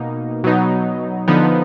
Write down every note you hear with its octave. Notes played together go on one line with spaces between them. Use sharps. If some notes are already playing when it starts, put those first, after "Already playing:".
Already playing: B2 A#3 D#4
B2 F#3 B3 D#4
D3 F3 B3 D#4